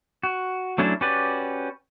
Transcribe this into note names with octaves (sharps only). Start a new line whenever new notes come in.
F#4
F#3 A3 C#4 D4 E4
C#4 F#4 G4 B4 D5